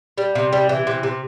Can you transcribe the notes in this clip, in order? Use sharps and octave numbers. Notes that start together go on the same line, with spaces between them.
G3
C3
G3
E3
C3
C3